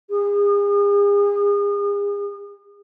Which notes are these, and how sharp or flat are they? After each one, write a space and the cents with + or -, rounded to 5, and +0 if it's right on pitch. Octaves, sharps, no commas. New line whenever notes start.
G#4 -40